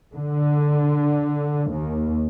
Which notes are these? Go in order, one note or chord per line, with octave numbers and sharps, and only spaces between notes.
D3
D#2